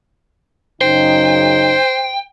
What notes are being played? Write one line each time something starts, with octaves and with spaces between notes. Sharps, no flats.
F#2 C#3 D#4 C5 G5